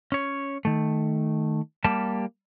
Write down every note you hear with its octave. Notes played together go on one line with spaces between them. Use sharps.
C#4 C#5
D#3 A3
G3 A#3 G4 A5